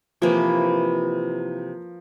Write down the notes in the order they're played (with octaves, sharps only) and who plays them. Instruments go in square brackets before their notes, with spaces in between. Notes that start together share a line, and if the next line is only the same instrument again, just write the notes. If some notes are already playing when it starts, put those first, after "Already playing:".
[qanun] C3 E3 A#3 E4 [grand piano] F3